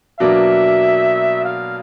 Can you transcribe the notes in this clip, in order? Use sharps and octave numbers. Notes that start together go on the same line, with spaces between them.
B2 F#3 A#3 D4 E5
F5